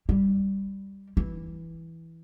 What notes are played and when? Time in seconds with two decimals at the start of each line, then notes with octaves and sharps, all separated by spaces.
0.09 G3
1.17 E3